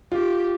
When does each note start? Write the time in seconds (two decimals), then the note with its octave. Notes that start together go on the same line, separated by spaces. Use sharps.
0.12 F4 G4